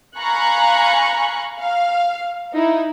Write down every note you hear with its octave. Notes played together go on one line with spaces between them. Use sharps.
F5 G#5 A#5 B5 C#6 F#6
F5
D#4 E4